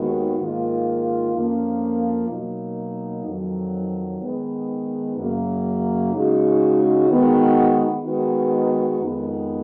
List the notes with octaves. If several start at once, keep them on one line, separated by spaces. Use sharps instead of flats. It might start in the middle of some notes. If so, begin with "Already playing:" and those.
Already playing: D#2 D#3 G#3 B3 F#4
G#2 D#3 A#3 F4
F2 F3 A#3 C#4
B2 F#3 A#3 D#4
F2 D#3 F#3
D#3 G#3 B3
F#2 C#3 F#3 A#3
C#3 G#3 D#4 F#4
D#3 G#3 B3 F#4
D#3 G#3 B3 D#4 F#4
F2 D#3 G#3 B3